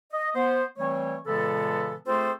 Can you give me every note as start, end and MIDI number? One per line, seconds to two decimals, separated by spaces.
0.13 0.31 75
0.35 0.63 59
0.35 0.63 72
0.79 1.17 52
0.79 1.17 55
0.79 1.17 57
0.79 1.17 60
0.79 1.17 73
1.27 1.95 46
1.27 1.95 49
1.27 1.95 52
1.27 1.95 56
1.27 1.95 59
1.27 1.95 69
2.07 2.32 57
2.07 2.32 60
2.07 2.32 65
2.07 2.32 68
2.07 2.32 69
2.07 2.32 72